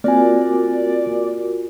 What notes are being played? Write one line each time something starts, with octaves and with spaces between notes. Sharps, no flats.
A#3 C4 F4 F#4 A#4 D5 G#5